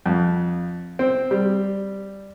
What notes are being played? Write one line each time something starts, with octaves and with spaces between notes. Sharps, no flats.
F2
C4
G3